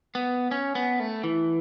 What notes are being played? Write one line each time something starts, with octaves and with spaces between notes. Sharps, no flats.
B3
C#4
B3
A3
E3